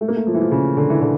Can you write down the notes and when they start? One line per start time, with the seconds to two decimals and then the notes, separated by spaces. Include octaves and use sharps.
0.01 A3
0.08 A#3
0.16 A3
0.27 F3
0.34 E3
0.42 F3
0.51 C#3
0.77 D3
0.90 E3
1.02 D3